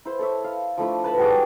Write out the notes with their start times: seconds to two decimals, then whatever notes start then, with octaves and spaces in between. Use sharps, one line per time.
0.05 E4 C5
0.19 A4 C#5 E5
0.44 F5
0.77 F3 A3 D4 E4
1.04 B4 A5 B5
1.18 G3 F#4 G#4 D6